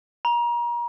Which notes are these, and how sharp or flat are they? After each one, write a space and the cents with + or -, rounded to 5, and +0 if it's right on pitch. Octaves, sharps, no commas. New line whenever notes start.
A#5 +35